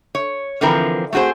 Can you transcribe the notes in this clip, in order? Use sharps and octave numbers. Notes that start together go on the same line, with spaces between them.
C#5
D3 E3 F3 C4 A#4 B4
A3 C4 F#4 G#4 C5